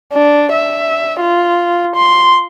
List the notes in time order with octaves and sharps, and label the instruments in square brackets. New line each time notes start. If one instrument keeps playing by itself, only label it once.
[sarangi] D4
E5
F4
C6